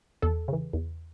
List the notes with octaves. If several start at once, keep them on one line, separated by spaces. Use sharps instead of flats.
E2 A4
C#3 E3
E2